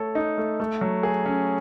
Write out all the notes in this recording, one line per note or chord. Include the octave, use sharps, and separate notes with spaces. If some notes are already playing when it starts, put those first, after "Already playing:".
Already playing: A3 A4 C#5
D#4
A3
A3
F#3
G#4
C#4